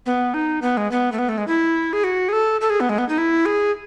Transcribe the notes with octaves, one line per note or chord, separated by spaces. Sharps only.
B3
D#4
B3
G#3
B3
A3
B3
A3
G#3
E4
G#4
F#4
G#4
A4
A4
G#4
B3
G#3
B3
D#4
E4
G#4